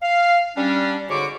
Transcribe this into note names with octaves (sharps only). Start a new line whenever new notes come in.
F5
G3 C#4 D4
G#2 D3 F#4 C#5 D6